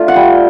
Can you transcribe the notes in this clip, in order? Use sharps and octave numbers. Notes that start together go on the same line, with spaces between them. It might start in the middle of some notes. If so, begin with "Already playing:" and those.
Already playing: A3 D4 F4
F#5
G3 G5